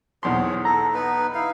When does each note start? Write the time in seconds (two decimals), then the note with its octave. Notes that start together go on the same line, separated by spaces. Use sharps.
0.23 B1 E2 G#4 C5 C#5 C6
0.65 A4 A#5
0.94 B3 D#4 B4
1.35 D#4 E4 F5